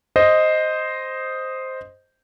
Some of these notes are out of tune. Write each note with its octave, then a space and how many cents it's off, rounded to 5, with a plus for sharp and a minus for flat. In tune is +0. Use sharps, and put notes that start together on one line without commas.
C5 +0 D#5 +0